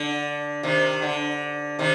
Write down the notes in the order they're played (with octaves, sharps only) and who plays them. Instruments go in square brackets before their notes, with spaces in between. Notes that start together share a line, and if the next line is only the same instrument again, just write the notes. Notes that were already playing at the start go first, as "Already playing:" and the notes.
Already playing: [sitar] D3
C3 D#3
D3
C3 D#3